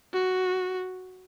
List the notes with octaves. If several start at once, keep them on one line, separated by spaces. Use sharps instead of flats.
F#4